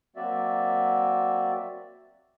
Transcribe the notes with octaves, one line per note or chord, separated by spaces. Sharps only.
F#3 A#3 C4 F#4 D5 E5